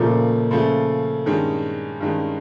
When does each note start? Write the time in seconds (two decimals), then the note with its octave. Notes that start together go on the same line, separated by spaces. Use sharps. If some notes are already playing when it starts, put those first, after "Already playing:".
Already playing: A#2 C#3 F3 A3
0.51 C#3 F3 A3
1.26 G2 D#3 G#3 C#4
2.00 G2 D#3 G#3 C#4